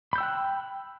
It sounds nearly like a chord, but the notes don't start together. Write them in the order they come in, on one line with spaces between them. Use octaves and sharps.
B5 G6 E6 G5 F#6